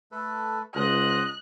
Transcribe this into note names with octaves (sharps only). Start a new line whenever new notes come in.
A3 A4 B4
C#2 C5 D#5 F#5 F#6